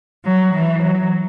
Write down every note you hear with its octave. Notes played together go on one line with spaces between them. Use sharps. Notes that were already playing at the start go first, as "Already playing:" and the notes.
F#3
E3
F#3